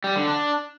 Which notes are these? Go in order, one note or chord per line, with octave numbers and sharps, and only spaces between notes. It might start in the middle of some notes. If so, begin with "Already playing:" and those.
G3
D3
D4